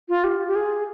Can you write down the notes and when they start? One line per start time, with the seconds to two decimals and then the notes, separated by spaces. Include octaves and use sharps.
0.09 F4
0.24 G4
0.47 G4
0.55 G#4